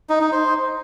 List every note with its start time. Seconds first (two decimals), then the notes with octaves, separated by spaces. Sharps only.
0.09 D#4
0.21 D#4
0.32 C5